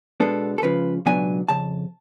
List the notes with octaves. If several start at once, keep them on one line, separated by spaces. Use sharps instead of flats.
B2 G#3 B3 D4 A4
A4
C#2 C#3 F3 B4
C#2 B2 F#3 B3 D4 G#5
F2 C#3 A5